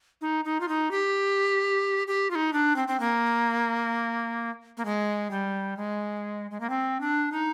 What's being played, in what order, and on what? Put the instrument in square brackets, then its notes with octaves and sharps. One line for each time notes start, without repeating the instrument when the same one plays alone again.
[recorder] D#4
D#4
F4
D#4
G4
G4
F4
D#4
D4
C4
C4
A#3
A#3
G#3
G3
G#3
G#3
A#3
C4
D4
D#4